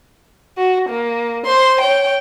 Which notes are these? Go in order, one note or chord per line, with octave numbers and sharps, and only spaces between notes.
F#4
A#3
C5 C6
C#5 G5